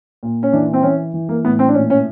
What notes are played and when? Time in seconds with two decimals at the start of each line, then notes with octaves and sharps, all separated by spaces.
0.23 A#2
0.43 C#4
0.53 E3 D4
0.74 C4
0.83 E3 C#4
1.14 E3
1.29 A#3
1.44 A2 B3
1.59 C4
1.68 D4
1.74 A#2 C#4
1.90 C#4